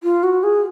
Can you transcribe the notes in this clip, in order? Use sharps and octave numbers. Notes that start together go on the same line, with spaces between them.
F4
F#4
G#4